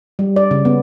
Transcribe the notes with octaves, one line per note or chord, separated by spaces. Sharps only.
G3
D5
C#3
B3